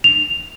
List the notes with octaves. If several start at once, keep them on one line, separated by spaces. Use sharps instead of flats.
F7